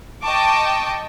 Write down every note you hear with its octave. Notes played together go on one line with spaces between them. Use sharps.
D#5 G5 A5 C#6 D6